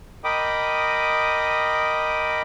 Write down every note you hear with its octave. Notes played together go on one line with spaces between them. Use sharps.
A#4 D#5 G5 B5 D6 D#6